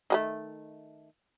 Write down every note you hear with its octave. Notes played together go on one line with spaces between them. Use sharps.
D#3 G#3 A3